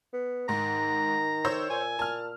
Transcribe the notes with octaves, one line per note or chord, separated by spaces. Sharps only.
B3
G#2 D#3 A#5
C5 C#5 E6
A#2 G#5
A#2 A5 F6